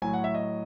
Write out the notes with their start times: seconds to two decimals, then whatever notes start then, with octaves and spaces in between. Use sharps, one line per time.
0.02 A2 F#3 G#5
0.13 F#5
0.24 E5
0.35 D#5